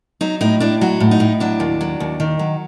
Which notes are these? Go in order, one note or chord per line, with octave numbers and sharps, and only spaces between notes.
F#3 D#4
A2 D#4
A2 D4
F#3 F#4
A2
D#4
A2
F#3 D4
D#2
F#3
D#2
D#3
F#3